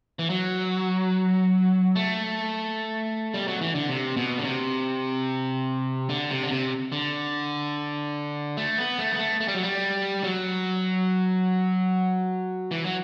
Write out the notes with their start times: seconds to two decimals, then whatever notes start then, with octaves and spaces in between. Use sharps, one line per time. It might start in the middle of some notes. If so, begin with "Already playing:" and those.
0.19 E3
0.30 F#3
1.96 A3
3.34 G3
3.48 F#3
3.61 E3
3.75 D3
3.89 C3
4.17 B2
4.38 D3
4.44 C3
6.09 D3
6.30 C3
6.43 D3
6.51 C3
6.92 D3
8.57 A3
8.78 B3
8.99 A3
9.12 B3
9.19 A3
9.40 A3
9.48 G3
9.55 F#3
9.63 G3
10.24 F#3
12.71 E3
12.84 F#3